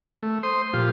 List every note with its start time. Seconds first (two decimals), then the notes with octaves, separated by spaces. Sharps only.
0.23 A3
0.43 C5 C6 D#6
0.73 A#2 F3 F4 G4